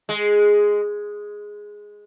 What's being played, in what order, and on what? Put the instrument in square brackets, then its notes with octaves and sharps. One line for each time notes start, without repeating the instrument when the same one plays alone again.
[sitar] G#3